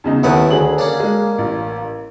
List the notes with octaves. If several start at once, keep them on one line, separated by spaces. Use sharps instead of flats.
E2 C#3 D#4
D#2 A2 D#3 B3 B4
D2 D3 G#4 F#7
A#3 C#4 D4
G#3
A1